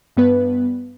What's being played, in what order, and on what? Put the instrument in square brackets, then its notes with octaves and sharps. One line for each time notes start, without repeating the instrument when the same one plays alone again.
[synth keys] G2 B3 B4